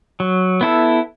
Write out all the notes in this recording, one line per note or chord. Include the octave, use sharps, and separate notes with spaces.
F#3
B3 E4 A4